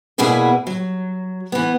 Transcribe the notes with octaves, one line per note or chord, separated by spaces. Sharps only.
E2 B2 A#3 E4 G#4 B4
F#3
E3 B3